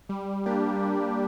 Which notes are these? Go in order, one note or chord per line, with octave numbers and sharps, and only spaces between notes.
G3
A#3 D4 G4
G3